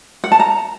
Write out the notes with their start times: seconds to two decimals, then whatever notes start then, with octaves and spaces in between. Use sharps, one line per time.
0.24 F#5
0.32 A5
0.40 A#5